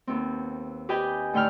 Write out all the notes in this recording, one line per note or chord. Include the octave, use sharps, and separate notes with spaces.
D#2 B3 C4
G4 B4 D#5 G5 G#5
A2 D3 D#4 G5 B5 F6